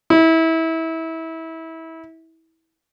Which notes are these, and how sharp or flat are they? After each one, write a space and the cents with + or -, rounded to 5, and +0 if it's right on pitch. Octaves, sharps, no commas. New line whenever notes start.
E4 -25